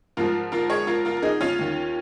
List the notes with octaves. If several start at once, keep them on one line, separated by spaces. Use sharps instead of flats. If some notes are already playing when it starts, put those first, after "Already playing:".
G#2 F3 F4 A#4
F4 A#4
G#4 C#5
F4 A#4
F4 A#4
A#4
D#4 G#4
C#4 F4
D#2 D#3